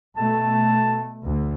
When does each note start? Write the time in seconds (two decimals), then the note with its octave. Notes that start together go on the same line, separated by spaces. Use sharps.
0.16 B2 A3 A5
1.24 D2